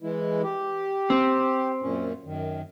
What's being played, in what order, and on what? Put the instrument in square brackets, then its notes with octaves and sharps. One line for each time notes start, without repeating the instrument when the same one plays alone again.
[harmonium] E3 G#3 E4
G4
[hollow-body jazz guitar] C4
[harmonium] F#2 A#2 C#4
F#2 D#3